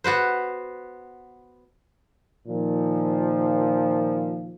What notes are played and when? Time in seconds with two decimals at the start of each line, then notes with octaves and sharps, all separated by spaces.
0.04 B3 F#4 B4 C5
2.47 A#2 D#3 F3